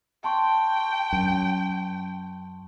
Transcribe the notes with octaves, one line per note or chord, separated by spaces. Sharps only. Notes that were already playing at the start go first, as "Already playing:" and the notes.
G5 A5 C6 C#6
F#2